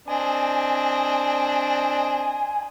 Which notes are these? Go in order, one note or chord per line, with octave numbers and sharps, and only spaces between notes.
C4 D4 D#5 G#5